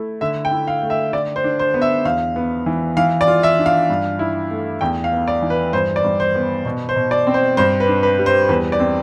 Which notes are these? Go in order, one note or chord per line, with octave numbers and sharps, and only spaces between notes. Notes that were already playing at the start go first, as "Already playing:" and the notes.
Already playing: A3 E4
D3 E5
G5
E4
F5
A3
E5
D3 D5
C5
D4
C5
B3
E5
E2 F5
B3
E3
E3 F5
D5
F4
E5
D4
F5
G2
E4
A3
E2 G5
F5
B3
D5
E3
B4
G2 C5
D5
G2
C5
B3
B2
C5
B2
D5
C4
C5
G2 C5
B4
D4
B4
G3
C5
E2 B4
D5
C4